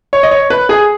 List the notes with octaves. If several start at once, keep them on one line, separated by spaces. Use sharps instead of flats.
C#5
D#5
C#5
B4
G#4